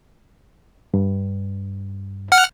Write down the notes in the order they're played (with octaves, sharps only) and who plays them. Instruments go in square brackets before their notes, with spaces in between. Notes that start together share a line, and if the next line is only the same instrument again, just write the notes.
[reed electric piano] G2
[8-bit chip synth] F#5 F6